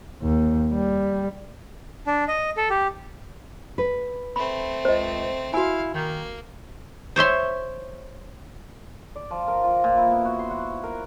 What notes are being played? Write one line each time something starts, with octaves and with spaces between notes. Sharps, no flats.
D#2
G3
D4
D#5
A4
G4
B4
A3 C4 B5
C#2 C5 D#5
E4 F#4 F5 G#5
D#3 A#3
C5 C#5 E5 C6
D5
F3
A#4
F4
A#2
E4
B3
F#4
C6
F#5
A#4